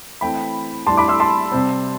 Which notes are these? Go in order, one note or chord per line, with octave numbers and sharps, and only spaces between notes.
E3 A3 C4 G5 B5
A2 G3 D4 A5 C6
B5 D6
C6 E6
A5 C6
C3 G3 C4